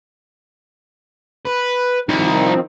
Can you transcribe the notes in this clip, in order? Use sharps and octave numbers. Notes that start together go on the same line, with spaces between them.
B4
C2 D#3 F3 C4 D#4 B5